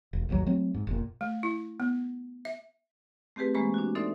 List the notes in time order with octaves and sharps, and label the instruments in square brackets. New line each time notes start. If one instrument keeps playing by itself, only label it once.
[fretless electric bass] E1
A1 D#2 G#2 F#3
F#3 A3 C4
G#2
F1 A#2
[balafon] A3
E4
B3
E5
[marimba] A3 C4 G4 G#4 B4
E3 G#3 A#3 C5 B5 C#6
D4 F#4
D#4 A4 C5 D5 E5 C6